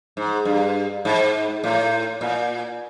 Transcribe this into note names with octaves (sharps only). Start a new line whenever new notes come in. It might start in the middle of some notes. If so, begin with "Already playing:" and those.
G#2
G2
G#2
A2
A#2